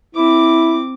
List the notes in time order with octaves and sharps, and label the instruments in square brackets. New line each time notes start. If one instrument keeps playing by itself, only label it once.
[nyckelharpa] C4 D6 [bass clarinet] E4